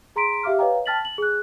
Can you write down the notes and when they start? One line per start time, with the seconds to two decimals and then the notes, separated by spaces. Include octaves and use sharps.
0.16 G#4 A#5 C6 B6 D7
0.43 G4 E5 F5 D6 F6
0.59 B4 C#5 D#5 F5 G5 A#5
0.86 G5 A5 F6 A6 B6 F#7
1.02 A6 F#7
1.18 G#4 F#6